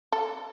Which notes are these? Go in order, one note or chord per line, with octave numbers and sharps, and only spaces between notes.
A4